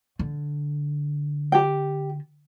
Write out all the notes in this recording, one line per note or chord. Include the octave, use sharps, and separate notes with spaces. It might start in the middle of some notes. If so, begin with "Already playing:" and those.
D3
G4 G5